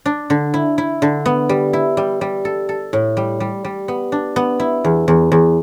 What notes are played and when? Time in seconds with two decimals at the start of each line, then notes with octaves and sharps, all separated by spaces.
0.06 D4
0.30 D3
0.54 E4
0.78 E4
1.02 D3
1.26 B3
1.49 G3
1.73 E4
1.97 G3
2.21 G3
2.45 A4
2.69 A4
2.93 A2
3.17 G3
3.40 G3
3.65 G3
3.88 B3
4.12 D4
4.36 B3
4.60 E4
4.85 E2
5.08 E2
5.32 E2